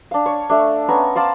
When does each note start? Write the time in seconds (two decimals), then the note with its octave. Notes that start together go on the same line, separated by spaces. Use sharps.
0.11 D4 F5
0.26 C#5
0.49 A3 D4
0.88 B3 C#4 A#5 C#6
1.15 C5 D5 F5 A5